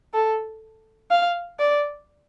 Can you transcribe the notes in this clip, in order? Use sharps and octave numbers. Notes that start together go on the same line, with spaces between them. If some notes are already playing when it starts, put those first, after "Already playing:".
A4
F5
D5